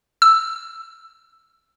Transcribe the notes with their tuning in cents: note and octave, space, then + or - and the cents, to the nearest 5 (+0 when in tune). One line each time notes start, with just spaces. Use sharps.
E6 +0